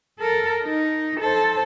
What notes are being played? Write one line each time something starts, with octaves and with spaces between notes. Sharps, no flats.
A4 A#4
D#4
A4 C5